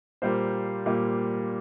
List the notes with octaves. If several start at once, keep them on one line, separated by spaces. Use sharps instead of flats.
A#2 G3 A#3 C5
A#2 G3 A#3